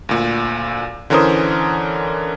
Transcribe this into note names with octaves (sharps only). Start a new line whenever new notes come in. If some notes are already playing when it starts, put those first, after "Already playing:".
D2 A#2
D3 E3 C#4 A#4 C5 D#6